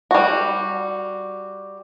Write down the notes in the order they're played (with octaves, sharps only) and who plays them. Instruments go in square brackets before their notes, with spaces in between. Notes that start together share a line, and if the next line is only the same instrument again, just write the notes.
[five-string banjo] G3 F#4